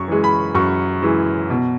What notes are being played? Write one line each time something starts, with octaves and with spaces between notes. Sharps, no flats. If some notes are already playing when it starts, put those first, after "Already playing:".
Already playing: F#2 C#6
E3 G#3
B5
F#2 C#6
E3 G#3
B2